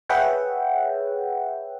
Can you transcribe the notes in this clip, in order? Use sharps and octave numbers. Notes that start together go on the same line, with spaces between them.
G#4 B4 C#5 E5 F#5 G5